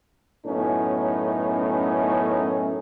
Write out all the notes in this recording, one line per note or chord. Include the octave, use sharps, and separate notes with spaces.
F#2 A2 A3 B3 C#4 D#4